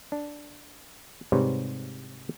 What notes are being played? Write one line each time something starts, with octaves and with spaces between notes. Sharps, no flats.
D4
G#2 C3 G3 B4 C#5